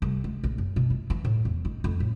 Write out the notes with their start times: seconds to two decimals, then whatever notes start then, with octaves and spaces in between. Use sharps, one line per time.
0.02 C2
0.24 G#3
0.44 A#1
0.58 F#2
0.76 B2
0.90 E4
1.10 E3
1.25 A2
1.45 E2
1.65 D#4
1.84 F2
2.00 A2